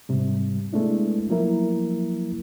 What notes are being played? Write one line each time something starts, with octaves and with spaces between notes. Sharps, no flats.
G#2 C3 G3
G#3 A3 B3 D4 E4
F3 F#3 A#3 E4 A#4